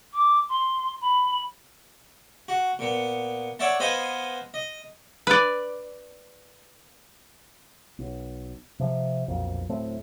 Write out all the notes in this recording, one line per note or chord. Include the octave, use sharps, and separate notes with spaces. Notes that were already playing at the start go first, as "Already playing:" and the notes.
D6
C6
B5
F#4
A#2 B3
C#5 D5 E5 F#5 A5
B3 B4 C5 D#5 F5 G#5
D#5
B4 D5
B1
C3 F3
B1 F2 A#2
D1 A2 A3 C4